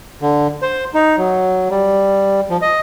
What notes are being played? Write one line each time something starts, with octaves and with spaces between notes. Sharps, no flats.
D3
C5
D#4
F#3
G3
F3
D#5